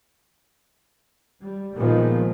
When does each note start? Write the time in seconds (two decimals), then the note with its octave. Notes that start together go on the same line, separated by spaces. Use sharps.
1.41 G3
1.76 A#2 D#3 F3 G#3 B3